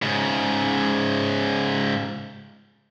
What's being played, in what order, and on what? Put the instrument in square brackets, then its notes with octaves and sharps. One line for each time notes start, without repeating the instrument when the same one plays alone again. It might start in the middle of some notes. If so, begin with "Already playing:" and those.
[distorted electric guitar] G#2 C#3